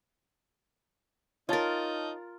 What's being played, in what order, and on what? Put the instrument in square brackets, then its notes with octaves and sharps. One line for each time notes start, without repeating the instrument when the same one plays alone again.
[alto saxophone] D#4 [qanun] F4 A#4 [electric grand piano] C#5 A5 A6